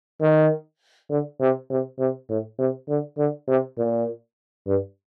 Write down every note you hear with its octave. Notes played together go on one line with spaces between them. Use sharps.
D#3
D3
C3
C3
C3
A2
C3
D3
D3
C3
A#2
G2